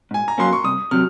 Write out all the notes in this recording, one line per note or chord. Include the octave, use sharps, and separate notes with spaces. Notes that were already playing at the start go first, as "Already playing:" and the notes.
G#2 G#5
A#5
F#3 A#3 C#4 C6
C#6
C2 D#6
C3 F#3 F6